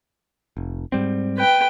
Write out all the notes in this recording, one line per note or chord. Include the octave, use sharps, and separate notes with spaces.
F1
G#2 G3 C4
B4 G5